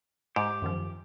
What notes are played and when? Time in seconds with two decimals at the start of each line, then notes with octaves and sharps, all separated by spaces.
0.36 G#2 G4
0.62 F#2 D#3 F3